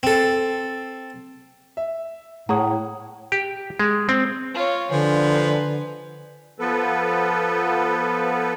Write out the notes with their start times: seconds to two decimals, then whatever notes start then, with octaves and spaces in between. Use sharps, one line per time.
0.03 C4 A4
1.77 E5
2.49 A2 A3 G#4 C#5 F#5 A#5 D#6
3.32 G4
3.79 G#3
4.09 C4
4.54 F4 C#5
4.91 D3 F3 B4 G#5
6.58 F3 B3 A4 B4